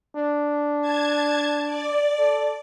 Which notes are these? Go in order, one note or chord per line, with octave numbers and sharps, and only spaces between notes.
D4
A5 G#6
D5
A4